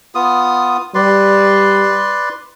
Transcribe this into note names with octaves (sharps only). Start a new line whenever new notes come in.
B3 F4 D#6
G3 B4 D5 C6